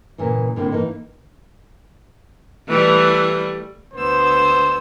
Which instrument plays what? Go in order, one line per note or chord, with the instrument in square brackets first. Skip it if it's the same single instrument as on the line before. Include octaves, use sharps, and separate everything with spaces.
[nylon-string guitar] A#2 C#3 E3
A2 D3 A#3 C4
E3 A#3 D#4
[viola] E3 [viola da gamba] G3 A3
[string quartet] D2 B3 E6 [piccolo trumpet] C5